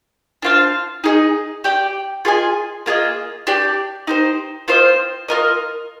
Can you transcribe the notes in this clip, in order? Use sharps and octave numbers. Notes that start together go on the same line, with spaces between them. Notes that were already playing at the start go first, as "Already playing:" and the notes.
D4 F4 C5 F5
D#4 G#4 D#5
G4 D5 G5
F4 G#4 D#5 G#5
A#3 F4 G#4 D#5
D4 G4 D5
D#4 G4 C5
C4 F4 C5 D#5
F4 A#4 D#5